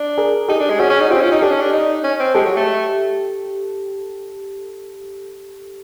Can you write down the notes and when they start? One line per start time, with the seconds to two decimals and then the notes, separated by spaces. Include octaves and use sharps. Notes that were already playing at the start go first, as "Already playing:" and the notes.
Already playing: D4
0.18 G#4 A#4
0.48 D#4 G4 A4
0.60 D4
0.70 G#3
0.80 C#4 F#4 G#4
0.90 C#4
1.00 D#4
1.10 C4 F4 G4
1.21 C#4
1.32 D#4
1.42 D4 G4 A4
1.51 C#4
1.60 D4
1.73 D#4
2.04 C#4
2.20 C4
2.35 G#3 G4 A4
2.46 F#3
2.56 A3